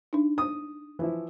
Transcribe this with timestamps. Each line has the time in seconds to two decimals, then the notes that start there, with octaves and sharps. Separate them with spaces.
0.13 D4 D#4
0.38 D#6
0.99 E3 F3 E4